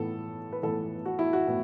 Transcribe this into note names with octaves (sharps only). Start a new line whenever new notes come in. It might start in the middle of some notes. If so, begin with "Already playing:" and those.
Already playing: A2 E3 B3 A4
B4
A2 E3 B3 A4
F#4
E4
F#4
A2 B3